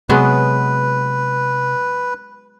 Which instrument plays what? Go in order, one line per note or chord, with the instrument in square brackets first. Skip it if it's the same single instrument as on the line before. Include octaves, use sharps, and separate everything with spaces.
[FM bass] C3 [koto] F#3 G#3 B3 [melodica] B4